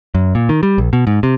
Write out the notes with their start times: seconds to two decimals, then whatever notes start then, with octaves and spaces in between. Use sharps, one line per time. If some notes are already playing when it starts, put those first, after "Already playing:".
0.15 F#2
0.35 A#2
0.49 D#3
0.63 G3
0.78 A#1
0.93 B2
1.07 G#2
1.23 C3